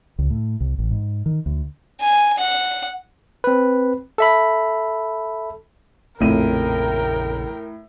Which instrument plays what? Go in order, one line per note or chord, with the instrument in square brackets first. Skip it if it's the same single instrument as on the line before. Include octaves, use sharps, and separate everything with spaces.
[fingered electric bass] C#2
A2
C2
A1
G#2
D#3
D2
[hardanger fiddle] G#5
F#5
[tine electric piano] C4 B4
A4 E5 B5
[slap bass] A#1 C#3 [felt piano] F2 D#7 [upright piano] A2 [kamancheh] A#4 G5